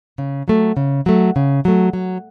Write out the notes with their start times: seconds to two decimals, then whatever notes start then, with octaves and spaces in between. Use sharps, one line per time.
0.18 C#3
0.48 F#3 A3
0.77 C#3
1.06 F#3 A3
1.36 C#3
1.65 F#3 A3
1.93 F#3